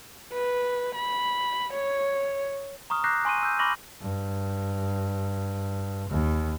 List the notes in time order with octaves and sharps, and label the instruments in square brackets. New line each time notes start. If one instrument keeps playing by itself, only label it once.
[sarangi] B4
B5
C#5
[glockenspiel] A#5 C#6 D#6 F6
A#5 D6 F#6 G6 A#6 C7
G#5 C6 C#6 D#7
E6 G6
B5 C#6 D6 F6 A#6 F#7
[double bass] G2
D#2